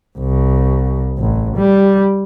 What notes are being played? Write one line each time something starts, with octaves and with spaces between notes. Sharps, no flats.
C2
A1
G3